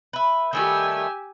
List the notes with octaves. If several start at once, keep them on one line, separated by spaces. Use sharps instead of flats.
B4 E5
D#3 G3 A3 G4 G#5 E6